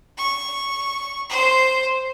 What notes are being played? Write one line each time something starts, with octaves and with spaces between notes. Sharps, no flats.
C#6
C5